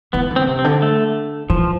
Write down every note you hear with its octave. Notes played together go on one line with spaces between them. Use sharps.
E3 B3
D3
C4
C3
C4
D3
A3
E3 F3